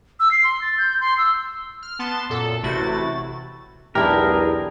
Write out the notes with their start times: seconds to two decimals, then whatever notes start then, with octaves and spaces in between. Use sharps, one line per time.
0.20 E6
0.31 C7
0.44 C6
0.62 A6
0.78 G6
1.00 C6
1.18 E6
1.82 F6
1.99 B3 A5 C6 A6
2.29 F#2 A#2 A4
2.63 A1 C3 A3 E4 F#4 A6
3.95 B1 E2 D4 E4 G4 G#4 A#4